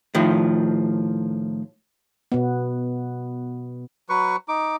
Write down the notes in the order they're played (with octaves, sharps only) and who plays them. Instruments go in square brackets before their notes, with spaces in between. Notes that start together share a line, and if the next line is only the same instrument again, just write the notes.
[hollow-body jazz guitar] A2 D#3 F3
[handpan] B2 B3
[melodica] F#3 B4 C#6
D#4 D6